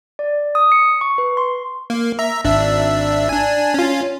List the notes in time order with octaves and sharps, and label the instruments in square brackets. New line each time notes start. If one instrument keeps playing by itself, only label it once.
[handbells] D5
D#6
C#7
C#6
B4
C6
[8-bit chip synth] A#3
E5 A#5
G#1 D4 E5
D4 G#5
C#4 F4